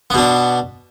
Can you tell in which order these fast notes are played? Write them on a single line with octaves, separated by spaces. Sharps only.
B3 B2 D4